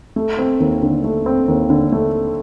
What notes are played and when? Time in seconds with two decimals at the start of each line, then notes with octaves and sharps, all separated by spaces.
0.16 A3
0.38 C4
0.60 D#2
0.82 D3
1.04 A3
1.26 C4
1.48 D#2
1.70 D3
1.92 A3